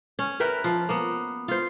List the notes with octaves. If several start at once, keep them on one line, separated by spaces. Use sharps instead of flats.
C#4
A#4 B4 E5 G5
F3
A#3 B3
F4 C5